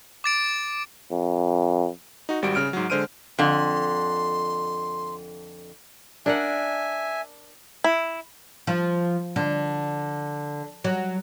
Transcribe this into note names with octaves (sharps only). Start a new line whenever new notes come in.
D6 A6 D7
F2
D#4 F#4
G#1 G3 F#4 D7
C#3 F6 D7
G#2 F#3
D3 G#3 C5 F6 D7 D#7
F2 D3 C6
D4 A#4 E5 F#5 G#5
E4
F3
D3
F#3